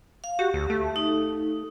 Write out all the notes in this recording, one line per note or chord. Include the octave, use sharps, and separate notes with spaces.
F5
F#4 G4
D2
A3
D#4